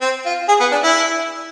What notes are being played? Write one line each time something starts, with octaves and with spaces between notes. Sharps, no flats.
C4
F4
G#4
B3
D4
E4